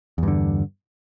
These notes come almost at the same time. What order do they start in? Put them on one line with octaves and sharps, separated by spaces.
E2 G2 D3